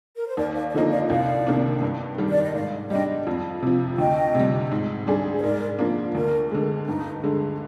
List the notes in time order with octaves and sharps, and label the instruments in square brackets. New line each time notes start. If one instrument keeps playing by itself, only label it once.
[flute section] A#4
C5
[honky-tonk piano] D#2 [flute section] A#4 D5
[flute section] D5 F5
D5
[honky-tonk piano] D3 F3 A#3 D#4 [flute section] C5 D#5
[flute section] D5 F5
[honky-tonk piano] C2 [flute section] D5 F5
[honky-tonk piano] C3 D#3 A#3 D4
G2
D#3 G3
[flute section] D5
D#5
[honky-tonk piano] G#2 [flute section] D5 F5
[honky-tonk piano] G3 D4 [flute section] D#5 G5
[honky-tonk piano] F2
C3 F3
[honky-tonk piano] D2 [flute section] D#5 G5
[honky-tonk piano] C3 G3
G#2
G3 D4 G#4
[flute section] C5
[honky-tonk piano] G#2 [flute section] A#4 D5
[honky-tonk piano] F3 A#3 D4
[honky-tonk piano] D2 [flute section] A#4
[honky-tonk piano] D3 G#3
[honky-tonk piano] G2 [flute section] D#4
[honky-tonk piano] D3 G#3